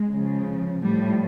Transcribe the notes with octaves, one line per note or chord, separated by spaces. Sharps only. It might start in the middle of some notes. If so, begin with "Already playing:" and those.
Already playing: G#3
C#3 F3
A2 F3 G3